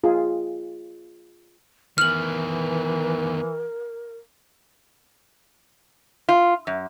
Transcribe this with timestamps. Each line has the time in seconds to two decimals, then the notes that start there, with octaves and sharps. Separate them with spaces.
0.04 F4 G#4
1.98 D#3 E3 B3 A#4 F6 F#7
6.29 F4
6.67 F#2